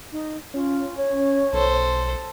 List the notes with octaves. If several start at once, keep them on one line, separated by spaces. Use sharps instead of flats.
D#4
C#4 F4
C#5
B1 A4 C5